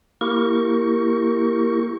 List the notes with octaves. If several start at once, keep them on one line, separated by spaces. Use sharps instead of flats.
A#3 E4 G4 A#4 C#6